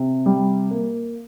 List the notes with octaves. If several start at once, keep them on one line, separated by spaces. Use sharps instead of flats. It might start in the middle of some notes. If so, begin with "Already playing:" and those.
Already playing: C3
G3
A#3